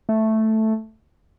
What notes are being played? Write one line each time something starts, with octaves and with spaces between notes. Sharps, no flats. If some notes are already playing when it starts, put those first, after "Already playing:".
A3